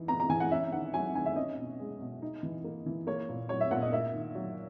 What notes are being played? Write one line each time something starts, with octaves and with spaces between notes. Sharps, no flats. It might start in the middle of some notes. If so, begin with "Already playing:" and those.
Already playing: E3 D#4
B3 A#5
A#5
E3 G#5
F#5
C#4 E5
D#3 F#5
F#3 G#5
D#3 G#5
E5
C#4 D#5
B2
G#3
B2
D#4
E3
A#3
E3
A#3 C#5
A#2
F#3 C#5
E5
A#2 F#5
D#5
A#3 E5
D#3
F#3